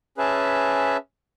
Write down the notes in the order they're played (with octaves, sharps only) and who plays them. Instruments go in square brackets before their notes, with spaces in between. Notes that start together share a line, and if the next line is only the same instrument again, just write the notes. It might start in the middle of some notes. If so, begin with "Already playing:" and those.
[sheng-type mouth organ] C#4 G#4 B4 E5 A5